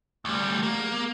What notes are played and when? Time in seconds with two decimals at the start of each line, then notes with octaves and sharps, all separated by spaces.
0.25 D2 G3 A3
0.63 A#3
0.79 G#4
0.91 B3